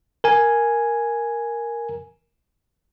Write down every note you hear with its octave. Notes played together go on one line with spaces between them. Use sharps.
A#4 G#5